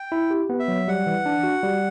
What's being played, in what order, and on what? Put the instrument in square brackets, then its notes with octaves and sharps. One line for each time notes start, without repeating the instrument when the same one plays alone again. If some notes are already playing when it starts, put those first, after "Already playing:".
Already playing: [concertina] G5
[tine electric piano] E4
G4
B3
[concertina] E5
[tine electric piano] F#3
[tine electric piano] G3 [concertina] F#5
[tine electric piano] E3
D4
F#4
G3